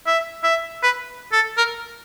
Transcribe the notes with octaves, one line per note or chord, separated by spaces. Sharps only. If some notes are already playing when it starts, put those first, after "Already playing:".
E5
E5
B4
A4
A#4